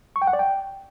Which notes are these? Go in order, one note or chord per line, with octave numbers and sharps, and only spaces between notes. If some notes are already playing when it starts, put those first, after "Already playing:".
C#6
G5
F#5
D5
G5